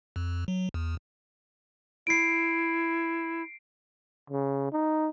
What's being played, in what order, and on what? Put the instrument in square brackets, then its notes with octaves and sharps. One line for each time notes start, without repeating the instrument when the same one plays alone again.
[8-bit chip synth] F2
F#3
E2
[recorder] E4 [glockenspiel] C7 D7
[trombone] C#3
D#4